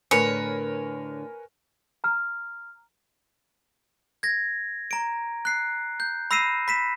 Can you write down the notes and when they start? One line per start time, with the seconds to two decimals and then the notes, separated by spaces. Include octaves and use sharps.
0.11 A2 D3 A#4 B4 C#5 G#5
2.04 A#5 F6
4.23 G#6 A#6
4.91 A#5 D7
5.45 F#6 C7
6.00 G6
6.31 B5 E6 A#6 C7 D#7 E7
6.68 B5 B6 E7